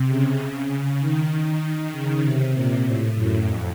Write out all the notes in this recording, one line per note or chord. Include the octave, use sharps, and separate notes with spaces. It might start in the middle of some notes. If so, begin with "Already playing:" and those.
Already playing: C3
C#3
D#3
D#3
C#3
C3
A#2
A2
F#2
F2